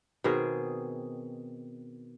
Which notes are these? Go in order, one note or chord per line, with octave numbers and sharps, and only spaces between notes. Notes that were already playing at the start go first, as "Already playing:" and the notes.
B2 D#3 C4 G#4